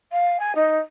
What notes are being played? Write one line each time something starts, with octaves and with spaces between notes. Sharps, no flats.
F5
G#5
D#4